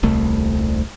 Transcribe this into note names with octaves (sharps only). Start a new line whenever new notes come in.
D#1 C2 A3